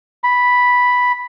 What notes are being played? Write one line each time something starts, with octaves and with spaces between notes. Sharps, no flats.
B5